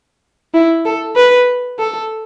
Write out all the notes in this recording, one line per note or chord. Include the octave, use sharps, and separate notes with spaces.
E4
A4
B4
A4